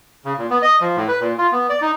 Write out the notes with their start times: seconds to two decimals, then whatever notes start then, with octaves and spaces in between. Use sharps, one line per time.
0.25 C#3
0.38 A#2
0.50 B3
0.62 D#5
0.81 F3
0.97 A2
1.08 B4
1.20 A#2
1.38 F4
1.52 B3
1.69 D5
1.81 D#4